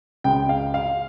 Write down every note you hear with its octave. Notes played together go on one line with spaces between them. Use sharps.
C#2 C#3 G#3 G5
F5
F5